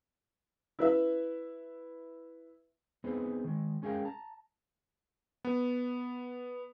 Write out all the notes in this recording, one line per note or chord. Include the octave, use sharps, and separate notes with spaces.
E4 B4 E5
B3 C4 D#4 G#4 B4 C5
D#3 G#3
G#3 C#4 G#4 A#4 F5 G5
A5 A#5
B3